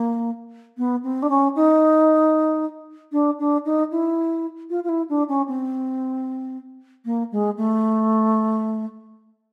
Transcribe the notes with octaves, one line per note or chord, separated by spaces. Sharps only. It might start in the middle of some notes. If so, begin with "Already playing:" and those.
Already playing: A#3
B3
C4
D4
C#4
D#4
D4
D4
D#4
E4
F4
F4
E4
D4
C#4
C4
A#3
G#3
A3